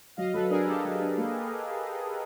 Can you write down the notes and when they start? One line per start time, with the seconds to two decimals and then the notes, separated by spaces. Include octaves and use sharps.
0.17 F#3 D#5 F5
0.34 F#3 A4 B4
0.50 D4 G#4 A#4
0.67 D4 G4 A4
0.84 F#3
1.01 D4
1.17 A#3